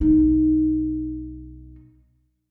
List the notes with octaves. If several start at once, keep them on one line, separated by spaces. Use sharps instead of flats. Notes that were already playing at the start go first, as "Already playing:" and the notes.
B1 D#4